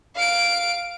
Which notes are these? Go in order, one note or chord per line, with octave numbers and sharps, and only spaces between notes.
F5 D7